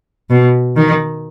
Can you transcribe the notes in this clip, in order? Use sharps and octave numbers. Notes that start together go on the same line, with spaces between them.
B2
D#3